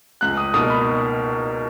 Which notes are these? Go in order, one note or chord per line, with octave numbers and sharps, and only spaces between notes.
C#2 F#6
D#6
B2 A#3 D#4 A#4 D#6
B5